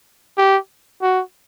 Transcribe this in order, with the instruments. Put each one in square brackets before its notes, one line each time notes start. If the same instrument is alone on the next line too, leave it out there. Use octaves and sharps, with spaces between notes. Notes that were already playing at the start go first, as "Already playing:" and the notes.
[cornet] G4
F#4